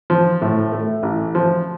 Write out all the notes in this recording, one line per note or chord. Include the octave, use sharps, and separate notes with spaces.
F3
A2
A3
A1
F3